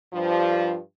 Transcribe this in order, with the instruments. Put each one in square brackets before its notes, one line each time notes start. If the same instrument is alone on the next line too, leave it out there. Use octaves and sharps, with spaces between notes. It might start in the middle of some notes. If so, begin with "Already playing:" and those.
[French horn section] G2 F3